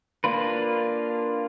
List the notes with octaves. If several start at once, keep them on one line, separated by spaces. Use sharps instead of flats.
A#3 D4 F4 B4